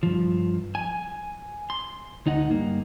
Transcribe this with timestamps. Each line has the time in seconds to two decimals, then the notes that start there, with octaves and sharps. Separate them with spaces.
0.03 G2 F3
0.75 G#5
1.70 C6
2.26 D2 D#4 D#5 F#5
2.49 G2 A#3